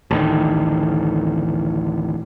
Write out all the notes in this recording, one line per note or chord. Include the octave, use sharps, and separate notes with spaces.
A1 D2 D#3